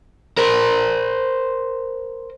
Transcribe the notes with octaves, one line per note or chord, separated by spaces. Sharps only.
A#4 C5